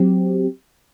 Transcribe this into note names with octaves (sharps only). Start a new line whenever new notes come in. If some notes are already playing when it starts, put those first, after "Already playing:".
Already playing: F#3 C4 G4